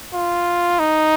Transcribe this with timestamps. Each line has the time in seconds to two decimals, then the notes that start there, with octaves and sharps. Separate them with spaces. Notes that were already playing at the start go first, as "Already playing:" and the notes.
0.14 F4
0.79 D#4